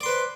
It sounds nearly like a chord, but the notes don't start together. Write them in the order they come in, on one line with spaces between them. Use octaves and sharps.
D5 C6 B4 C5